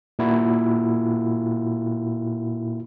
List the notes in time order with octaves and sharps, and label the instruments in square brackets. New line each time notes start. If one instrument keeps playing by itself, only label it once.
[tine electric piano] A#2 E4 F#4